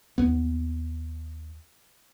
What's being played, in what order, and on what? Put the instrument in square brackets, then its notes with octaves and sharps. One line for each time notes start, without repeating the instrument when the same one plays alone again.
[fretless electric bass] D#2 B3